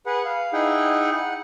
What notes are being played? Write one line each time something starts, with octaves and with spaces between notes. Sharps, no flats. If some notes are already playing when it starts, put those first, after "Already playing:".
G#4 B4 F#5
F5
D#4 E4 G#4 F#5 G5
F#5